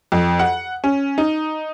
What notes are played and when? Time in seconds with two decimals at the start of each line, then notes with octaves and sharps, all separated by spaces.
0.12 F2
0.39 F#5
0.84 C#4
1.18 D#4